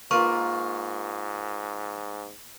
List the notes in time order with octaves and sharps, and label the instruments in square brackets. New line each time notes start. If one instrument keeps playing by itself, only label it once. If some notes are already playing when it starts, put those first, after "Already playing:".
[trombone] G#2 [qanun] A#3 B4 [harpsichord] F4 A#4 [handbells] C#6